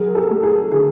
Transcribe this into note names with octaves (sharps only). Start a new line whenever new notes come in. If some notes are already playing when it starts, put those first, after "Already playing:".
Already playing: F#3 G#4 A#4
G4 A4
A3
G#4
D3 G#4